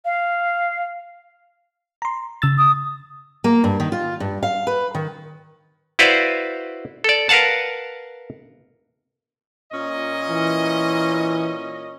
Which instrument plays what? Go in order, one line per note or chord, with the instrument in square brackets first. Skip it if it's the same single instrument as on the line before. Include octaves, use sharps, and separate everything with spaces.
[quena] F5
[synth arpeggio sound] A#5 C6
C#3 E6 A6
[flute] D#6
[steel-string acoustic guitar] A#3
G2
D#3
F4
G2
F5
B4
D#3
[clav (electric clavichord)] E4 F#4 B4 C5 D5 F5
A4 D5
A#4 B4 F5 F#5 A5
[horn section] A#2 C#4 D#5
[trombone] E3